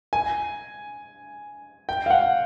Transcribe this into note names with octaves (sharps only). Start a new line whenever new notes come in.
G#5
G5
F5
F#5